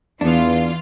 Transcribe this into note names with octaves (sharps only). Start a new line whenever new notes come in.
E2 E3 B3 D4 F4 F5